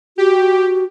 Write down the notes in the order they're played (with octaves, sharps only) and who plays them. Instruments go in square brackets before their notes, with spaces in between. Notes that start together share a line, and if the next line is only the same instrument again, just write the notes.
[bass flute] F#4 [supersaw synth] G4